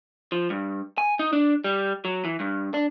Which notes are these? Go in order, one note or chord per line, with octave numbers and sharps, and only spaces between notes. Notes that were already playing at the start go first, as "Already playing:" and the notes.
F3
G2
G#5
D#4
D4
G3
F#3
E3
G2
D4